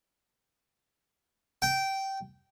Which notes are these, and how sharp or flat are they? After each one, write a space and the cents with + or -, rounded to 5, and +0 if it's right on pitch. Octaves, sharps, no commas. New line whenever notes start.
G5 -15